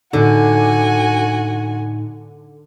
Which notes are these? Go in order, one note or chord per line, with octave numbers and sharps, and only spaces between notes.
A2 D3 D#4 F#4 G#5